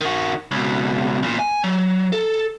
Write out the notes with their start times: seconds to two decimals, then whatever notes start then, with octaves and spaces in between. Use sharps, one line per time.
0.01 D#3 F#4
0.51 C#2 B2
1.23 E2 A#2
1.39 G#5
1.64 F#3
2.13 A4